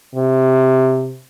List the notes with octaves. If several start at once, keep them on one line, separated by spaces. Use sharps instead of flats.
C3